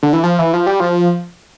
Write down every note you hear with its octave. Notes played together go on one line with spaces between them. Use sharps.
D3
E3
F3
E3
F3
G3
F3